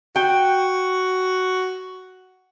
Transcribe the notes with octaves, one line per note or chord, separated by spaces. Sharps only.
F#4 G5